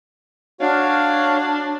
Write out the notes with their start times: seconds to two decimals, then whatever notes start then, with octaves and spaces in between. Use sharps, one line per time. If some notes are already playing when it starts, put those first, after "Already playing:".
0.61 D4 F#4 C#5 F5